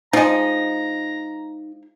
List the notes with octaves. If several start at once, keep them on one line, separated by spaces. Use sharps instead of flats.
F3 G#3 D#4 A#5